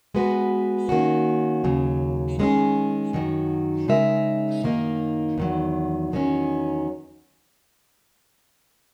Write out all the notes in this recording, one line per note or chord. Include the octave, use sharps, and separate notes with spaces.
G#3 B3 F#4 B4
D#3 A#3 C#4 F#4
D#2 C#3 F#3
D#3 G#3 C#4 G#4
F#2 D#3 F#3
C#3 G#3 D#4 A#4 E5
F#2 D#3 A#3 D#4
E2 D#3 F#3
E2 D#3 F#3 C#4